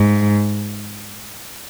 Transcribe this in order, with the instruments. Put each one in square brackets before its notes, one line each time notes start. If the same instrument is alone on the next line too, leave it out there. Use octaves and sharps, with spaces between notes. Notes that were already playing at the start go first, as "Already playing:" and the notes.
Already playing: [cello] G#2